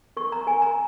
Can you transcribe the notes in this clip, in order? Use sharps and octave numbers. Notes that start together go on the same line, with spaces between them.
A#4 C#6
A#5
A#4 G#5
A#5